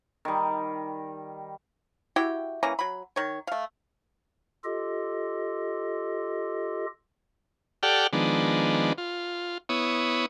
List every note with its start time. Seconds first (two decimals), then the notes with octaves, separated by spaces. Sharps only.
0.25 D#3 G3
2.16 E4 F#4 G4 G5
2.63 E3 A#3 C#4 A#5
2.79 F#3 B5
3.16 D#3 C#5
3.47 A3 F5
4.64 F4 G4 A4 D#5
7.83 G4 A4 D5 F#5 G5 F6
8.13 D#3 F3 G#3 B3 D4
8.98 F4
9.69 B3 E4 C#5 D#6